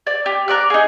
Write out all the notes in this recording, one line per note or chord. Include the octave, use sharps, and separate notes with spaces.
D5
G4
A#4 D5 F#6
D#4 G#4